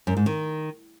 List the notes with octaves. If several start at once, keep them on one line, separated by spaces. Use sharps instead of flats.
F#2
G#2
D#3